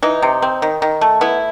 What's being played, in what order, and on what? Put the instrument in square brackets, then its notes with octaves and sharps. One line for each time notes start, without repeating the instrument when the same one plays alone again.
[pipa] E3 D#4
C3
C4
D#3
D#3
A3
B3 E4